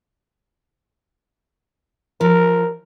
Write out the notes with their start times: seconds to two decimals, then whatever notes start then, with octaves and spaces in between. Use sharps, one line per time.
2.21 F3 A#4